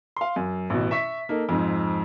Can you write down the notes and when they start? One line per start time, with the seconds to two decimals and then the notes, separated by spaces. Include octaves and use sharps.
0.17 F5 C6
0.36 F#2
0.70 A1 B2
0.91 E5 C#6 B6
1.29 A#3 D#4 A4
1.49 F2 G#2